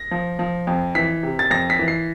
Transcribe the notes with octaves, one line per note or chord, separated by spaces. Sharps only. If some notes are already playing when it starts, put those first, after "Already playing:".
Already playing: A#6
F3
F3
F2
E3 B6
C3
A6
F2 A#6
B6
E3
C7